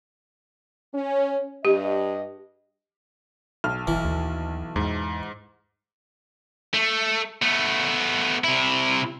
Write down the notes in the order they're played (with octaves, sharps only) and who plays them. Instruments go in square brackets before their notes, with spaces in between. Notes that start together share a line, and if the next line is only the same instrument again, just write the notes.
[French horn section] C#4
[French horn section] G2 D#5 [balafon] G4
[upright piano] B1 [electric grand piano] F6
[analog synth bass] G#1 [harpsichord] E3
[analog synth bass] D#2
[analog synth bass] E2 [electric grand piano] G#2
[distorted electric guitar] A3
A3 B3
C3 E4